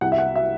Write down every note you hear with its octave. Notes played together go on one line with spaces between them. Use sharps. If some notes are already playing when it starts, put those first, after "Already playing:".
C2 F#5
E5
F#5
E5